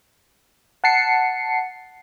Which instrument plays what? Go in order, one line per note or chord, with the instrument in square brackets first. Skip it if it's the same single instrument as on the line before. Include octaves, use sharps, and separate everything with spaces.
[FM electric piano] F#5 A5 C7 C#7